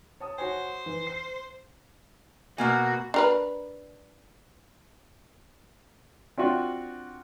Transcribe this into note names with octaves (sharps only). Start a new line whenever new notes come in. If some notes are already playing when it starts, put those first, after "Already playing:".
C#5 A5 D#6
F#4 C5 C#5 G#5
E3
C7
B2 A#3 F#4 G#5
D4 A#4 B4
C4 D4 F4 F#4